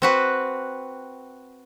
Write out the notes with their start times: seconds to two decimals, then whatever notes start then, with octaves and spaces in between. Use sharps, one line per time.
0.02 C4 F#4 B4